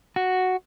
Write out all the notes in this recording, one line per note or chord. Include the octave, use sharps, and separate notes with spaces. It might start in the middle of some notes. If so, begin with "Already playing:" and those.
F#4